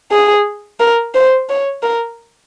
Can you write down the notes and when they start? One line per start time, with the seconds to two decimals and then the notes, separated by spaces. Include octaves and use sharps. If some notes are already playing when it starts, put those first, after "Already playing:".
0.11 G#4
0.80 A#4
1.14 C5
1.49 C#5
1.83 A#4